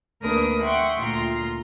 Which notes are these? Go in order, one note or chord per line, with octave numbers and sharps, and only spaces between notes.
D2 A#3 D4 A#4 B4 D#6
E5 F#5 G5 C6 C#6
D2 A#2 F4 A#5 C6